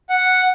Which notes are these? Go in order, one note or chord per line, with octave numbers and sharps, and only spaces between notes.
F#5